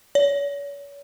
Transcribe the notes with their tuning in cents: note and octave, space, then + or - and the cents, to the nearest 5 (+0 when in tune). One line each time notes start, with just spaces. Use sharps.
C#5 +40